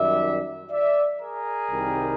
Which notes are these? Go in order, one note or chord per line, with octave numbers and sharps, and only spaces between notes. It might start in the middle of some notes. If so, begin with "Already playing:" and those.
Already playing: F#2 D#3 G3 D5 E5
D5 E5
G#4 A#4
C2 C3 D#3 G3